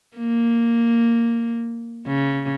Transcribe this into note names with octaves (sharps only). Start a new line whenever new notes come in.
A#3
C#3